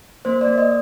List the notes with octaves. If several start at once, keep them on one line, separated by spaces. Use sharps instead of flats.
A#3 C5
D5
A#3
D#5